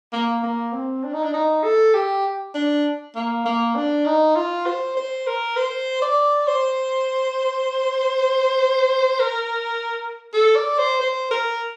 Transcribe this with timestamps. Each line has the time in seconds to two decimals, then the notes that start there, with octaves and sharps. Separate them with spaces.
0.13 A#3
0.43 A#3
0.73 C4
1.04 D4
1.14 D#4
1.23 D4
1.34 D#4
1.64 A4
1.94 G4
2.54 D4
3.15 A#3
3.46 A#3
3.76 D4
4.06 D#4
4.36 F4
4.66 C5
4.97 C5
5.27 A#4
5.57 C5
6.02 D5
6.48 C5
9.20 A#4
10.33 A4
10.56 D5
10.79 C5
11.01 C5
11.31 A#4